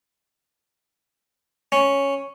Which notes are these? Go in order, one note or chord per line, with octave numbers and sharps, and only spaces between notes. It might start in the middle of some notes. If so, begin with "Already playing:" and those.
C#4